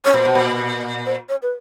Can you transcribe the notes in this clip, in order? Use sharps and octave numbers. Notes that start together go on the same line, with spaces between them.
C#5
A#2 C5
B2
A#2
C5
C#5
B4